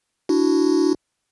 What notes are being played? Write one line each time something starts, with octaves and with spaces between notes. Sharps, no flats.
D4 E4 F#4